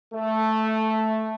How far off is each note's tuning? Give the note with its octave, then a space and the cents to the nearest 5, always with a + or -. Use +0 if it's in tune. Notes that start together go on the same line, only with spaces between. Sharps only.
A3 -5